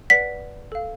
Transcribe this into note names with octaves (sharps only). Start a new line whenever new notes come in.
B4 D5 F#5 B6
A4 F5